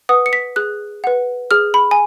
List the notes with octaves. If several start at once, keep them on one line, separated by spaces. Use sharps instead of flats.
B4 F#5 D#6
C#7
B6
G#4 F#6
B4 F#5
G#4 F6
B5
G#5